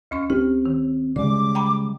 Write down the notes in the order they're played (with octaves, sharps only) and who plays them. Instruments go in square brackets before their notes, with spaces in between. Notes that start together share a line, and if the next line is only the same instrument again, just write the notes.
[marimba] D2 C#4 C#6
[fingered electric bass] C4 [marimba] G4
[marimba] D#3
[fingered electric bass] C#3 G3 G#3 [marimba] D5 [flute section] D6
[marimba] G5 A#5 B5